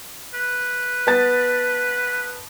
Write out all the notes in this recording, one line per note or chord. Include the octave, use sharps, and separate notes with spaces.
B4
B3 A5 A6